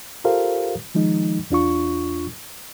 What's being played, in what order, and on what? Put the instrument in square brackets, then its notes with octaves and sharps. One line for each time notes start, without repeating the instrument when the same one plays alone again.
[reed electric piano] F4 G4 A4 A#4 C5 F5
D#3 F3 G#3 D#4
E2 D4 F4 C#6